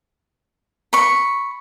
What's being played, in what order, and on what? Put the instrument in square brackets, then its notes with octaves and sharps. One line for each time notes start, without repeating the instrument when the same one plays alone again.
[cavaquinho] B5 C#6